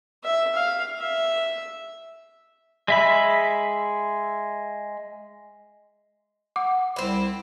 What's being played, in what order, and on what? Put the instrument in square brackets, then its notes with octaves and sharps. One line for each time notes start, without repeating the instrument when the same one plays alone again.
[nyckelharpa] E5
F5
E5
[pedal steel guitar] G#3 E5 B5
[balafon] F#5 [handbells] D6
[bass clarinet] C2 [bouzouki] C4 E4